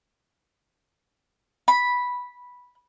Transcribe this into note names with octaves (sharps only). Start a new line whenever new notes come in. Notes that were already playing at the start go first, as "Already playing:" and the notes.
B5